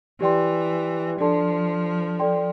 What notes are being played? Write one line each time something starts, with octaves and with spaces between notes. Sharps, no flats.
E3 G4 D5 G5 C6
F3 D4 A4 D5 A5 C6
A4 D5 G5 C6